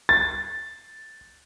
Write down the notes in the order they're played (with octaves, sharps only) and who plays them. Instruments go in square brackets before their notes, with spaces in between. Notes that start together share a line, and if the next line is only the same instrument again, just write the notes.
[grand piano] A6